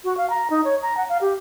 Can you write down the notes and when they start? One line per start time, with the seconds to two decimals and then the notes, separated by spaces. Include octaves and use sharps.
0.04 F#4
0.17 F5
0.30 A#5
0.50 D#4
0.64 C#5
0.82 A#5
0.97 F#5
1.09 F5
1.21 G4